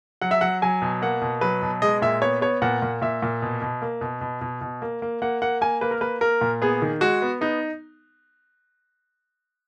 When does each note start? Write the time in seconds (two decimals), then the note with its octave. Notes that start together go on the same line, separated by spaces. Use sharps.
0.21 F#3 F#5
0.31 E5
0.41 F#3 F#5
0.62 F#3 G#5
0.82 B2
1.02 A#3 F#5
1.22 B2
1.41 F#3 B4
1.62 B2
1.82 G#3 D#5
2.02 A#2 E5
2.22 B3 C#5
2.41 B3 C#5
2.62 A#2 F#5
2.82 A#2
3.02 A#2 E5
3.22 A#2
3.42 B2
3.62 B2
3.82 A#3
4.01 B2
4.21 B2
4.41 B2
4.61 B2
4.82 A#3
5.02 A#3
5.22 A#3 F#5
5.42 A#3 F#5
5.61 A#3 G#5
5.81 A#3 B4
5.91 A#4
6.01 A#3 B4
6.21 A#3 A#4
6.41 A#2
6.62 B3 G#4
6.82 D#3
7.01 G#3 F#4
7.22 B3
7.41 B3 D#4